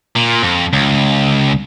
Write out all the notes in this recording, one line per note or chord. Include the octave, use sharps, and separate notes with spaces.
A#2
F2
C#2